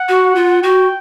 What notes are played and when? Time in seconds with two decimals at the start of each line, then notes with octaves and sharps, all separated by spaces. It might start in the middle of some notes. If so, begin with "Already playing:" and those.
Already playing: F#5
0.09 F#4
0.35 F4
0.62 F#4 G5